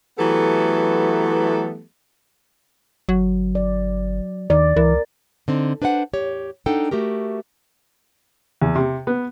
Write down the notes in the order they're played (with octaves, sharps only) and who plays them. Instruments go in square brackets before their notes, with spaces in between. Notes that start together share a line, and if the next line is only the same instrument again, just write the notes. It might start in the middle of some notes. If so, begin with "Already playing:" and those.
[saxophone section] E3 F#3 A3 B3 G4 A4
[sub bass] G1 [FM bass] F#3
[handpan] D5
[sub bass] D#2 [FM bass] D#3 [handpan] D5
[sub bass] C#2 [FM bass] E3 [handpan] A#4
[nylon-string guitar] D3 C4 D#4
D4 B4 C5 E5 F#5
G4 C#5
D4 D#4 A4 F#5 G5
A3 F#4 G4 A#4
[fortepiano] E2
C3
B3